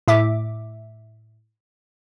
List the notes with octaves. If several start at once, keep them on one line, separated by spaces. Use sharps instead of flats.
A2 E5 D6